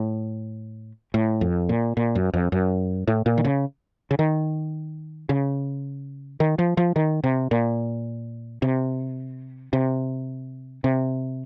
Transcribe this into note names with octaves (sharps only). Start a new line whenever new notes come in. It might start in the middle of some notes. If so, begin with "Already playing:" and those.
Already playing: A2
A2
F2
A#2
A#2
F#2
F2
F#2
A2
A#2
D#3
C#3
C#3
D#3
C#3
D#3
F3
F3
D#3
C3
A#2
C3
C3
C3